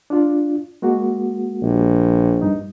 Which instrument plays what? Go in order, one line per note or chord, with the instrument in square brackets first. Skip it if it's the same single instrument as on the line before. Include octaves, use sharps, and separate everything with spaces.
[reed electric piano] D4 F4
G#3 A#3 F#4
[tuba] A#1
[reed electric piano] G2 D#4